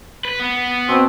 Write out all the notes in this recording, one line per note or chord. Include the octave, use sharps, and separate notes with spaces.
B4
B3
B2 C4